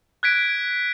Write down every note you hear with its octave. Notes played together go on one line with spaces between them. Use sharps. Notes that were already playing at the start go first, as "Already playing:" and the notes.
F#6 G#6 B6 D7